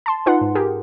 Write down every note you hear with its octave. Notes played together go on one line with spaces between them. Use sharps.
A5 C6
D#4 F4 B4 F#5 C6
G#2
G4 G#4 A#4